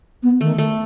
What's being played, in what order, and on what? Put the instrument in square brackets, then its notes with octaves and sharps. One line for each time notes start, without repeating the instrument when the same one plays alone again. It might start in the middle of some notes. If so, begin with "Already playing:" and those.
[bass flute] B3
[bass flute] D#3 [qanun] A3
[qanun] A3